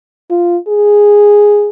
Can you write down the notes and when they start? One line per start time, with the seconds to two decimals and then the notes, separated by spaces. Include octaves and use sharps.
0.30 F4
0.68 G#4